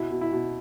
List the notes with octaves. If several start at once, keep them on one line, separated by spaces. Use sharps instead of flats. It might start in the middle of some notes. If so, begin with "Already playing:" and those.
Already playing: B2 E4
B2
E4
B2